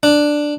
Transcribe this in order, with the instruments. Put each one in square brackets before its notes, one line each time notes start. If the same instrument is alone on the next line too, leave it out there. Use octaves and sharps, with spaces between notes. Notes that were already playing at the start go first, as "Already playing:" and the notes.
[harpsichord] D4